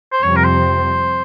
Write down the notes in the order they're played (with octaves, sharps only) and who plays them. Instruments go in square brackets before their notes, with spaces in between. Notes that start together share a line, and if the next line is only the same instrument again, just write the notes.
[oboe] C5
[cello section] F2 C3 G3 C4 [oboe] C#5
[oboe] A#4
C5